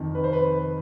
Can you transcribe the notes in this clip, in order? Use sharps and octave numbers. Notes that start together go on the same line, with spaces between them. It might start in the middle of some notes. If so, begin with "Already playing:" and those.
Already playing: F2 C3 D#3
B4
C5
B4